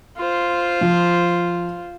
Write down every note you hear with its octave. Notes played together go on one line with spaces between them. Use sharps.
F4 C5
F3